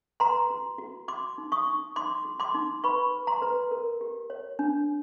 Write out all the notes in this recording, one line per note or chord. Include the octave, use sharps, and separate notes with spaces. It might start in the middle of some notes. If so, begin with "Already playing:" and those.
B4 A#5 C6
F#4
F#4
F#4 C6 D6
D#4
C#6 D#6
D#4
D#4 C6 D6
F#4
C6 D6
D#4
B4 B5 C#6
B4
A#5 C6
B4
A#4
G4
C#5
D4